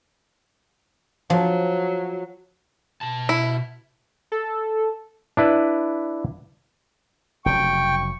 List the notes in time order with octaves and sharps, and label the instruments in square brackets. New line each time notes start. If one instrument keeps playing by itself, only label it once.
[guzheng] F3 [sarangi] F#3
[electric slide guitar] B2 A5
[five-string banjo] E4
[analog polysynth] A4
[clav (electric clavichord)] D4 E4 B4
[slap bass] F1 C#3 F#3 [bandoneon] G5 [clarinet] C#6